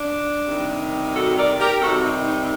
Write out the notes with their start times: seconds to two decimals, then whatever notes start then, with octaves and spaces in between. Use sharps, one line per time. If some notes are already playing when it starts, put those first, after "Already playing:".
Already playing: D4
0.48 C3 D#3 G3
1.14 F#4 A4
1.37 A#4 D5
1.59 G4 A#4
1.81 C3 D#3 G3 F#4 A4
2.03 D#4
2.26 D#4